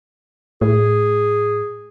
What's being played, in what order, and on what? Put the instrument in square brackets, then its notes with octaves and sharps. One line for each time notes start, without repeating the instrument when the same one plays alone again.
[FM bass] A2 [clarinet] G#4